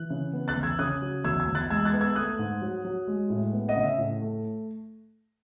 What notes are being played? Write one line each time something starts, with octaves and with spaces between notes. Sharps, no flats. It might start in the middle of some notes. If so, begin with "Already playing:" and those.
Already playing: E3 F#6
C#3
B3
F#6 A6
E2
E6 G#6
C#3 D#6 F#6
F#3
E2 E6 G#6
E6 G#6
E2
F#6 A6
G#3 E6 G#6
F#6 A6
B3
E6 G#6
A3 D#6 F#6
G#2
F#3
F#3
G#3
A2
B3
D#5 F#5
C#3
E5
A2
A3